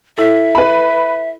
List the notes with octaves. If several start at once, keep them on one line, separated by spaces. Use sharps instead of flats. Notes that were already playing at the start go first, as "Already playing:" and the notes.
E4 A4 E5
B4 B5